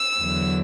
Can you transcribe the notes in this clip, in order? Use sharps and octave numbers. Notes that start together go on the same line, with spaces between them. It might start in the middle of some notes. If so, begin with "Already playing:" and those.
Already playing: E6
E2 D3 F#3